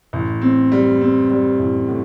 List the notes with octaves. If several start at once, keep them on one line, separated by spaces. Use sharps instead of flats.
A1
C4
G3
C4
G3
A1
A2